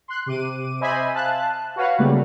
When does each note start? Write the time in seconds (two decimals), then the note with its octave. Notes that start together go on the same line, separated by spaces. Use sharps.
0.08 C6 F#6
0.26 C3 D6 D#7
0.81 C5 D#5 E5 G#5 B5
1.13 F5 A5 F#6
1.76 F#4 B4 C#5 F5 F#5
1.99 C#3 F#3 G3 A3 A#3